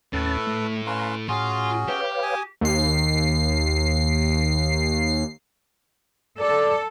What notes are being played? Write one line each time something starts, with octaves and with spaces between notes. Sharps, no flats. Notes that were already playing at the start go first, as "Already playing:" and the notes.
D#2 A2 C#4 A4 B4 A6
A3
C#4 B4 F5 A#5 C6
A2 C#4 F4 F#4 G#4
G4 B4 C#5 F5
G#5 D#6
D#2 C7
A4 D5